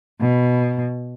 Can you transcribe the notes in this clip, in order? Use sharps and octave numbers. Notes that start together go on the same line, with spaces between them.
B2